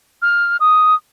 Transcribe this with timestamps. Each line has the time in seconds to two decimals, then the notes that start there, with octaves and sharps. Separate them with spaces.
0.22 F6
0.60 D#6